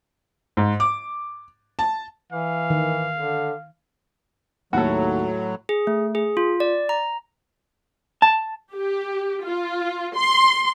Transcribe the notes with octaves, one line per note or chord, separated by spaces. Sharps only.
G#2
D6
A5
E3 F5
D#3
D3
D#2 A2 F#3 A3 F#4 A4
G#4
A3
G#4
F4
D5
A#5
A5
G4
F4
C6